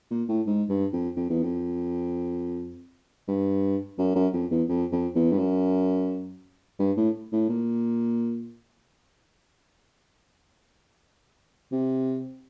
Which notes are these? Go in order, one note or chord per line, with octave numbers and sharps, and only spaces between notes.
A#2
A2
G#2
G2
F2
F2
E2
F2
G2
F#2
F#2
F2
E2
F2
F2
E2
G2
F#2
G2
A2
A2
A#2
C3